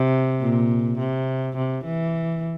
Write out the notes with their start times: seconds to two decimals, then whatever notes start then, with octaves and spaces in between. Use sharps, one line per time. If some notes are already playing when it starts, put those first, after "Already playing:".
Already playing: C3
0.41 A#2
0.99 C3
1.56 C3
1.85 E3